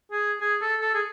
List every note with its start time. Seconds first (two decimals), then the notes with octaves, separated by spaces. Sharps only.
0.12 G#4
0.41 G#4
0.62 A4
0.81 A4
0.94 G#4